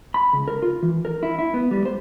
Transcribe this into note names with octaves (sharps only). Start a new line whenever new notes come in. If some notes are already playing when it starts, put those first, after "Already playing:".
B5
C#2
A#4
F4
E3
A#4
E4
E4
B3
G3
C5